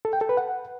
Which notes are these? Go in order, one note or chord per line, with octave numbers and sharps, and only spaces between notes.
A4
G5
A4
B4
F#5